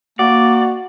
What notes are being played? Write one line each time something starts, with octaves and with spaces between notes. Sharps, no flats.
A#3 F#4 D5